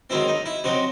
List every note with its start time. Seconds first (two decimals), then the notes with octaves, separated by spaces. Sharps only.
0.10 G#2 D#3 F#3 C4 E4
0.28 D#4
0.46 E4
0.64 C3 F#3 C4 D#4 F#4